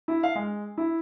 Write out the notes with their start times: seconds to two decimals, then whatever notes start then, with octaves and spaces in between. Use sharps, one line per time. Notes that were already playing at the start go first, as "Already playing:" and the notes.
0.08 E4
0.23 F5
0.35 G#3
0.78 E4